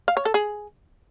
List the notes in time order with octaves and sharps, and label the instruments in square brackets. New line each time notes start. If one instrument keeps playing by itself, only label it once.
[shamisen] F5
C#5
A4
G#4